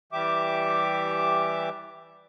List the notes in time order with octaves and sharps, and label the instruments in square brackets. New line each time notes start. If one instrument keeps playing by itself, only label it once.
[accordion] E3 G3 G4 E5 D6